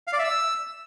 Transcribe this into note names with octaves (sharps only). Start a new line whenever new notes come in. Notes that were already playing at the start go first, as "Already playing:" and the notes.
F5
D5
E5
E6